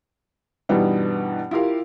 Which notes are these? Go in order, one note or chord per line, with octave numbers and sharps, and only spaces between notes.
G2 B2 E3 G3 B3 D#4
E4 F4 G4 A#4 F5